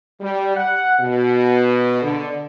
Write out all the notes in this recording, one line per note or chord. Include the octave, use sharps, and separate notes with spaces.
G3
F#5
B2
D3